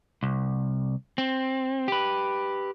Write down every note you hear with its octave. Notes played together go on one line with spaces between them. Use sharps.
C2
C4
G4 B4